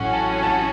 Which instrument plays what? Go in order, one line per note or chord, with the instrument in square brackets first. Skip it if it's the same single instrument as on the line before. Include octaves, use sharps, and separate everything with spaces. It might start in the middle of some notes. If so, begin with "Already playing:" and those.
Already playing: [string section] A1 A2 F#3 C#4 F#4 [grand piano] F#5
[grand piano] A5
A5